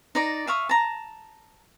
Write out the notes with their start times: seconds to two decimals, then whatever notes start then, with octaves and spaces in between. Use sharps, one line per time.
0.15 D#4 D5 A#5
0.47 E5 F5 C#6 D#6
0.69 A5 A#5